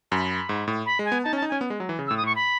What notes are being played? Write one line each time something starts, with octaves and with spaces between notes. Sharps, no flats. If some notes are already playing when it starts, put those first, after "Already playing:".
F#2 B5
G#2
A2
B5
G#3
G#5
B3
D#4 A5
C#4
A5
D#4
C#4 G#5
B3
G#3
F#3
E3
C#3
A2 E6
D#6
A2 C#6
B5